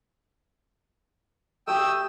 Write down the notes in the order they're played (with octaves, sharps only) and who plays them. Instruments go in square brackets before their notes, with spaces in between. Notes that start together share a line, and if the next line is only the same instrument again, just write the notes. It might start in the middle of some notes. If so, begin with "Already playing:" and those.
[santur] A3 G4 [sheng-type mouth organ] G5 D#6 E6